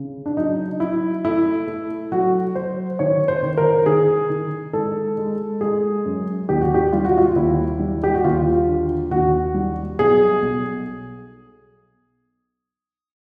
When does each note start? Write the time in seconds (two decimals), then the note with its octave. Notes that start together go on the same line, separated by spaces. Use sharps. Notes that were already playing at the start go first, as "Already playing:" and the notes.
Already playing: C#3
0.26 D4
0.37 F#3 D#4
0.80 F#3 E4
1.25 A3 E4
1.67 A3
2.12 F#3 F#4
2.55 F#3 C5
2.99 D#3 C#5
3.28 C5
3.43 D#3
3.57 A#4
3.86 D#3 G#4
4.30 D#3
4.73 G#3 A4
5.18 G#3
5.61 G#3 G#4
6.05 F#2
6.49 D#2 G4
6.61 F#4
6.74 G4
6.93 G3 F4
7.05 F#4
7.18 F4
7.36 D#2 E4
7.79 G3
8.04 G4
8.14 F#4
8.24 D#2 F4
8.67 D3
9.11 D#2 F#4
9.54 G3
9.99 B1 G#4
10.42 B1